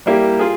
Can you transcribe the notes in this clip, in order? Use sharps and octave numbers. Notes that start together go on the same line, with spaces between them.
G3 A#3 E4 G4
F4 G#4